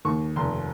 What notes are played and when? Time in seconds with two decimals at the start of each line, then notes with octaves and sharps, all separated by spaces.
0.05 D#2 C#6
0.36 F1 C6